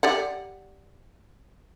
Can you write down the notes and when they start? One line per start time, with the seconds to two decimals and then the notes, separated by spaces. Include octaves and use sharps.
0.03 G4 D5 F#5